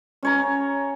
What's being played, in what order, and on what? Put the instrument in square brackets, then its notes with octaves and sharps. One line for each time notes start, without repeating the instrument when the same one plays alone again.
[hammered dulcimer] C#4 C#5 A#5